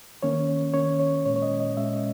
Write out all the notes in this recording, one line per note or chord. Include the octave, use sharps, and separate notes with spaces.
D#3 A#3 C#4 C#5
D#3 A#3 C#4 C#5
C#5
A#2 G#3 C#4 C#5
C#5
D#5
D#5
A#2 G#3 C#4 E5